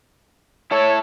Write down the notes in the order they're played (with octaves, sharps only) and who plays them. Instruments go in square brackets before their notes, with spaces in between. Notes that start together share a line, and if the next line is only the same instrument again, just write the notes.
[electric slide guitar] E4 A4 [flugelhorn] C#5